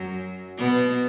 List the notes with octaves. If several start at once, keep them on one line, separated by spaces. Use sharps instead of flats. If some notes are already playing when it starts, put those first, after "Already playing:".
Already playing: F#2 F#3
B2 B3